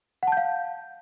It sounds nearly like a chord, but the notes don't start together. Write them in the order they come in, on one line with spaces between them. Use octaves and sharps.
F#5 A5 G6 F5